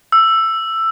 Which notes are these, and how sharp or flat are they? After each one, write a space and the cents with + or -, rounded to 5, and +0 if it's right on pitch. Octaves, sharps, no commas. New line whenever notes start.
E6 +10